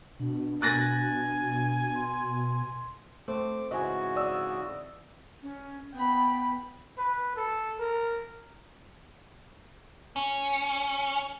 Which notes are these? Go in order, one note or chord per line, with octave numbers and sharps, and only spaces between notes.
B2 D4
B2 G#5 F#6 A6 A#6
C6
A3 C4 D6
G#2 C#3 E3 F#4 D#5 G#5
D5 D#6 E6
C#4
B3 G5 B5
B4
A4
A#4
C#4